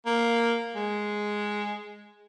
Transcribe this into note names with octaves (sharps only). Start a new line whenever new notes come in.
A#3
G#3